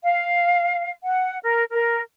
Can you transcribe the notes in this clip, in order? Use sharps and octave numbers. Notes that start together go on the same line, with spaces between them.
F5
F#5
A#4
A#4